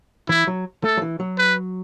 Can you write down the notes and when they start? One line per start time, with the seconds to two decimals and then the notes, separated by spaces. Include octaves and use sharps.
0.29 E3 E4
0.47 F#3
0.84 A3 A4
0.97 F#3
1.02 E3
1.20 F#3
1.38 B4